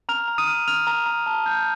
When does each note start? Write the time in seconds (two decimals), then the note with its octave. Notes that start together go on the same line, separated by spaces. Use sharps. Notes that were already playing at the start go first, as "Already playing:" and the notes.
0.09 A#5 F6 F7
0.28 A#5
0.38 D#6 D#7
0.48 F6
0.68 F6 F7
0.87 A#5
1.06 A#5
1.26 A5
1.46 G6